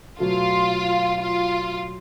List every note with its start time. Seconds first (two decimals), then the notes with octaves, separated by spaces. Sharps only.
0.19 B2 F#3 A3 F4
1.21 F4